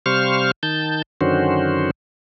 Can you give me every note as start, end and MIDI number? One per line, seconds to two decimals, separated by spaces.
0.06 0.51 48
0.06 0.51 55
0.06 0.51 72
0.06 0.51 77
0.06 0.51 85
0.06 0.51 89
0.63 1.02 51
0.63 1.02 81
0.63 1.02 91
1.21 1.91 42
1.21 1.91 50
1.21 1.91 51
1.21 1.91 61
1.21 1.91 66
1.21 1.91 72